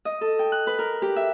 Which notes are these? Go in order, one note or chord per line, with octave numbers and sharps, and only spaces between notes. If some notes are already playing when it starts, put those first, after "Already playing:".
D#5
A4
G5
F#6
B4
A#4
G4
E5